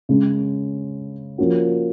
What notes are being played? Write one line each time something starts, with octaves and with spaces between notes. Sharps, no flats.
C#3 G#3 C#4
F3 A#3 C#4 F#4